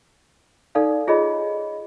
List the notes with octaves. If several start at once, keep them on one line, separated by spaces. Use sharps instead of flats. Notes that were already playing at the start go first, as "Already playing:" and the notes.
D#4 A4 D5 F5
F4 G#4 C#5 D#5 B5